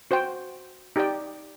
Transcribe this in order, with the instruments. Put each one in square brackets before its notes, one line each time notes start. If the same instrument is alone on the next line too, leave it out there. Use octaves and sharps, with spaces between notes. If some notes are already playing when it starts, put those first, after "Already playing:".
[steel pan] F#4 C5 G5
D#4 G4 D5 G5